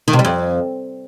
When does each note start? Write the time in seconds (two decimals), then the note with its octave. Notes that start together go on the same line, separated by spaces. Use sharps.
0.08 D#3
0.13 C3
0.19 G3
0.25 F2